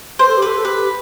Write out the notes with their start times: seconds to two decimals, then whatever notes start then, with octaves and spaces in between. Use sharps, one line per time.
0.19 B4 C5
0.28 A4
0.37 G4
0.42 A4 B4
0.56 A4
0.64 G4 B4